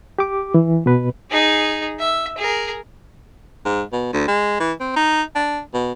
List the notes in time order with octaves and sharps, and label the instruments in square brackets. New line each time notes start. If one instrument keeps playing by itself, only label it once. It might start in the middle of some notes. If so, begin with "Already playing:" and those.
[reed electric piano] G4 D6
E3
B2 B4
[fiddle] D#4 G#4
E5
G#4 A#4
[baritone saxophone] G#2
B2
D2
G#3
E3
C4
D#4
D4
B2